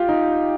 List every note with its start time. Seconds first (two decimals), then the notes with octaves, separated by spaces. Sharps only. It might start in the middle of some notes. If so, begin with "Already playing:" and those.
Already playing: F4 G4
0.09 D#4